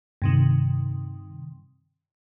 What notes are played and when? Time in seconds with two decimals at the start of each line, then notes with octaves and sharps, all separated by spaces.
0.22 G2 C3 D#3